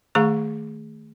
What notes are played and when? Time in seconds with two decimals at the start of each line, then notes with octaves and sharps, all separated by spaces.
0.15 D#3 A3 G#4 F5 A#5 C#6